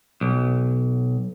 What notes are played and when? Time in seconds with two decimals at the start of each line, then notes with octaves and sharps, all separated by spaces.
0.21 B1